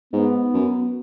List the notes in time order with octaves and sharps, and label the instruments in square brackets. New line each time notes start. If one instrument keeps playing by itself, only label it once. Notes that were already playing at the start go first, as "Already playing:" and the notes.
[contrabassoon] G#2 [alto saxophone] B3
[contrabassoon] F#2